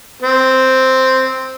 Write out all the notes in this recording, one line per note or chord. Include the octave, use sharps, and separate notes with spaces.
C4